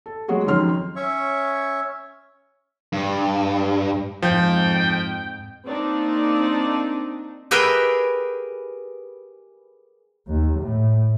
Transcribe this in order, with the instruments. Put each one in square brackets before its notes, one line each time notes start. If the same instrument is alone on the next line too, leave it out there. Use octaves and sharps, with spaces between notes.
[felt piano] A4
F#3 G#3 F#4 G#4
F2 D#3 F#3 C#4 C6 F6
[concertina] C#4 C#5 E5 C#6
[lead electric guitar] G2
[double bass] F2 G#2 [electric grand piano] F3 [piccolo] G5
[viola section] A#3 C4 D4 D#4 D5
[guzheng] G4 G#4 A#4 B4 E5 G5
[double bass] D#2
A2